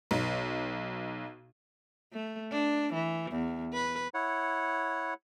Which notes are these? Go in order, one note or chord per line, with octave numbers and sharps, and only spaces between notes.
B1
A3
D4
E3
E2
B4
E4 C#5 F#5